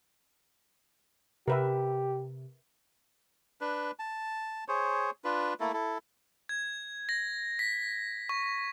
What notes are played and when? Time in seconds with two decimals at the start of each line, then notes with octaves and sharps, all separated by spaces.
1.48 C3 G4 A#4 B4 E5
3.61 D4 B4
3.99 A5
4.68 G#4 C5 C#5
5.24 D4 F4 B4
5.60 A3 A#3 E4 A4
5.74 E4 A4
6.49 G#6
7.09 A#6
7.59 B6
8.29 C#6